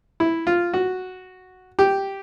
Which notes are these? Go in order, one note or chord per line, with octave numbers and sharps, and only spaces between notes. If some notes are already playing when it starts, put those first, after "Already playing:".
E4
F4
F#4
G4